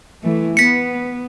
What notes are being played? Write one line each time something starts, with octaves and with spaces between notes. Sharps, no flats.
E3 A3
B3 B6 C#7